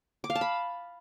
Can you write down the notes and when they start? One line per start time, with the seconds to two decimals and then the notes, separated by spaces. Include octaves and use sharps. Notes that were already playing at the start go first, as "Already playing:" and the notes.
0.24 D6
0.30 F5
0.35 A5
0.41 B5